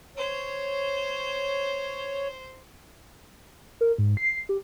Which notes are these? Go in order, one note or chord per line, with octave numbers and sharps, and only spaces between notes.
C5 C#5
A#4
G#2
C7
G4